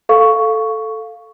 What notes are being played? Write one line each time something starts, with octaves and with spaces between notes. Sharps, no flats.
A4 F5 C#6